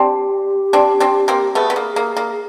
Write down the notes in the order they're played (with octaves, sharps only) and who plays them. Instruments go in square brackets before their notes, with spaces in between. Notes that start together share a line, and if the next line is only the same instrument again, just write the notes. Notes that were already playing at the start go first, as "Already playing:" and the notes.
Already playing: [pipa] C4 D4 [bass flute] G4
[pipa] C4 D4
C4 D4
A#3 C4
[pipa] A3 B3 [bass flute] G#4
[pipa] B3
A#3
A#3
A#3